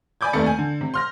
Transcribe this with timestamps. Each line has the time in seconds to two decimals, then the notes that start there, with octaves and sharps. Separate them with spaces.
0.21 D5 G#5 B5 D6 G6 G#6
0.33 F1 D#2 C3 A3 D5 C#7
0.46 G#5
0.58 D3
0.81 C3
0.94 C6 F6 A#6